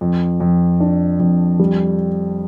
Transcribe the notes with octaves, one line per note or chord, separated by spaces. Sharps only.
F2
F2
D4
F2
G3